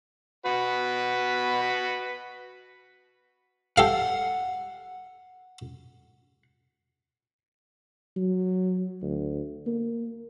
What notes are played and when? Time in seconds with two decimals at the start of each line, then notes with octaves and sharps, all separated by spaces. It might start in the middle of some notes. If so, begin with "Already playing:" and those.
0.46 F#4 B4
3.77 G4 A4 F5 F#5
8.17 F#3
9.02 D2
9.67 A#3